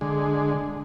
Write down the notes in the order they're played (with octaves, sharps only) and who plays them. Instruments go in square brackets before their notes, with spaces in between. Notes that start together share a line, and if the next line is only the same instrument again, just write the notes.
[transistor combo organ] D3 G#3